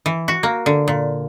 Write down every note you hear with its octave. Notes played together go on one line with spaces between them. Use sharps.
E3
F#4
A#3
D3
A#2